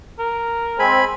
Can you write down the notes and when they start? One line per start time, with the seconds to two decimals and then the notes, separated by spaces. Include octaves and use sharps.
0.19 A#4
0.79 G#3 C4 G#5 B5